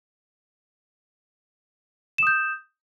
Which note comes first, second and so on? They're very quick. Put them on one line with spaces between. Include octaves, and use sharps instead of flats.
E7 D#6 G6